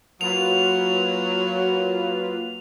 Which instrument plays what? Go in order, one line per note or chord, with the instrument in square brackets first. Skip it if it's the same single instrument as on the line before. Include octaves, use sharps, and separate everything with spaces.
[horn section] F#3 [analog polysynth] A#3 F4 B4 [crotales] F7